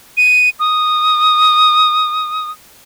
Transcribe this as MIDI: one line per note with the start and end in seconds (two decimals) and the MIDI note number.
0.17 0.50 99
0.60 2.50 87